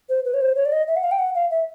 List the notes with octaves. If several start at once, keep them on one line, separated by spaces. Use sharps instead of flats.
C5
B4
C#5
C5
C#5
D5
D#5
E5
F#5
F5
G5
F#5
F5
E5